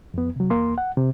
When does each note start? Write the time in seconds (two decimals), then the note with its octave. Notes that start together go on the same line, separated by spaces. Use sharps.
0.14 F2 B3
0.36 C3 F#3
0.50 E2 A#3 C6
0.78 F#5
0.97 C3